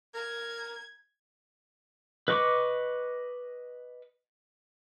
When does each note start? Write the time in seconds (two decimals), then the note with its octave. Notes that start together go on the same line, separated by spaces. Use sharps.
0.15 A#4 G#6
2.28 B4 D#5 C#6 D6